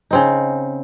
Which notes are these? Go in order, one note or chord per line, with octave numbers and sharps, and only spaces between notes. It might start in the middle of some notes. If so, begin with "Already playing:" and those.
C#3 C4 D#4